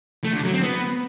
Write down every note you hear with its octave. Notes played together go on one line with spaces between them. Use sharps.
A3
D3
F#3
C4
B3